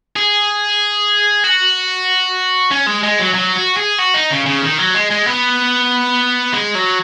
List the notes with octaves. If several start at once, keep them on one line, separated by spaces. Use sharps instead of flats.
G#4
F#4
C#4
G#3
G#3
F#3
F#3
F#4
G#4
F#4
D#4
C#3
C#3
D#3
F#3
G#3
G#3
B3
G#3
F#3